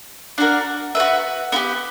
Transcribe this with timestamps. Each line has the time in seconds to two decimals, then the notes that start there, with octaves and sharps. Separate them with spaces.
0.38 D4 F#4 A#4
0.95 F#4 B4 E5
1.52 B3 E4 G4